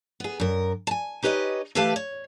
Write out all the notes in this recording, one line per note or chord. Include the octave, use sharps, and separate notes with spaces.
B3 G#4
F#2 A#4
G#5 A5
D#4 G4 B4 C#5 D#5
E3 A3 G4 B4 F5 A5
C#5